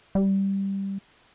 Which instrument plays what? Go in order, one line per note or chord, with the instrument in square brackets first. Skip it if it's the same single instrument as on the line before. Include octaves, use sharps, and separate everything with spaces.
[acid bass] G3